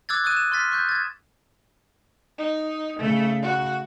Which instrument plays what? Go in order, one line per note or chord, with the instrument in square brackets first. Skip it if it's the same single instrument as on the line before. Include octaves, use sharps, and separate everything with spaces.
[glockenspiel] D6 E6 F#6 G#6 A6
C#6 D#6 F#6 D#7
E7
C6 F6 A6 B6
C#6 F#6 G6 A#6
G#6 A6
[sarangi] D#4
[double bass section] C#3 [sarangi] A3
[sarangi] F#4